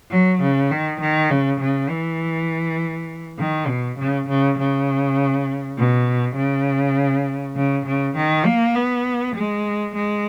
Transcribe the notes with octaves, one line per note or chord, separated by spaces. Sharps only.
F#3
C#3
D#3
D#3
C#3
C#3
E3
D#3
B2
C#3
C#3
C#3
B2
C#3
C#3
C#3
D#3
A#3
B3
G#3
G#3